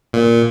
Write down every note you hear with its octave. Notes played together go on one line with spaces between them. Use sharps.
A#2